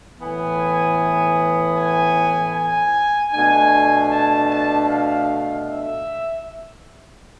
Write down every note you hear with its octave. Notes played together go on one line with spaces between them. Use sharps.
A2 E3 B3 G#5
G#5
G#5
B2 A3 D4 G#5
A5
A5
F5
E5